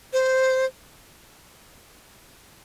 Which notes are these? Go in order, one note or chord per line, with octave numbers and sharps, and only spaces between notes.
C5